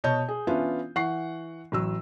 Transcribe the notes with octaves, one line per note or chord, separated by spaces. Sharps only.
B2 C#5 D#5 A5 G6
G#4
E3 B3 C#4 D4 E4 F4
E3 F#5 C#6 C7
A1 F#3 E6